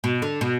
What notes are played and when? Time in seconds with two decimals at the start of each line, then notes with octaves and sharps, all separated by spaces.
0.04 B2
0.22 D3
0.41 B2